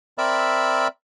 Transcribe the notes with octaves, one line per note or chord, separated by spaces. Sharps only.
C4 A#4 D5 E5 B5 E6